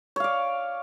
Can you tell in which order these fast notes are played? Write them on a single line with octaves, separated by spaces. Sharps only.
C#5 F5 D5